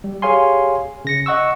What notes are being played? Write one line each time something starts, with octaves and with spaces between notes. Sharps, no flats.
G3
G4 G#4 C#5 F5 G#5 C6
C#3 A#6 C#7
D#5 F#5 C#6 E6